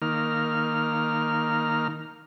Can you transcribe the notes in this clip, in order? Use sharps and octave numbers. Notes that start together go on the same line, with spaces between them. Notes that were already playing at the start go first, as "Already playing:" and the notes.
D#3 A#3 F6